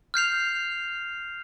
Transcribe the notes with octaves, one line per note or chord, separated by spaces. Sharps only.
F6 G6 C7 F7